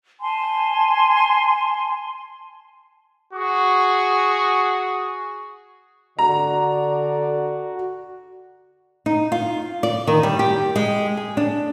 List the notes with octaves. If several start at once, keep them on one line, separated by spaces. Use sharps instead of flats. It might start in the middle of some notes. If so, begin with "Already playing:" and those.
G#5 A5 C6
F#4 G#4 C#6
D3 F#4 D5 A#5
D#4
F4
D5
D#3
G3
G4
G#3
G#4
D4